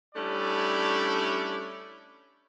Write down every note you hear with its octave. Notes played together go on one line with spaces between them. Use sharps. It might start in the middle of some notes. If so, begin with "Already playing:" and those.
G3 A3 C#4 D4 E4 D5